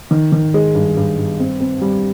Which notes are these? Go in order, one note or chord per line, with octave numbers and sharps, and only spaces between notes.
D#3
D#3
G#3
G2
G2
G2
C4
C4
G3